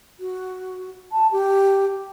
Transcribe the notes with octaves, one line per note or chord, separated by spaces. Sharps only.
F#4
A5
G4